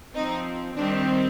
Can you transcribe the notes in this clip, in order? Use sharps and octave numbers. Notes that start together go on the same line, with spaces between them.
F3 C4 D#4
D#3 G3 C4 D4